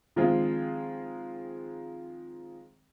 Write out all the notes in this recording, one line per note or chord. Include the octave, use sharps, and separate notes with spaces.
D#3 F3 G#3 C4 F4 G#4